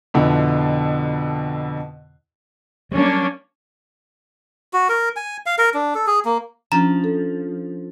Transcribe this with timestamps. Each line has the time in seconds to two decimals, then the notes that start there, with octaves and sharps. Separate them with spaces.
0.14 F2 B2 D3 E4
2.92 F#3 G3 A#3 C#4 D4
4.73 F#4
4.89 A#4
5.16 G#5
5.46 F5
5.58 A#4
5.74 D4
5.95 A4
6.07 G#4
6.25 A#3
6.72 F3 C#4 D4 A#5
7.04 A4